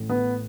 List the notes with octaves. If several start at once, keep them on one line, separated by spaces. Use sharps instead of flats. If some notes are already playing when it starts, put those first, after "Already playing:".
Already playing: A1 A2
B3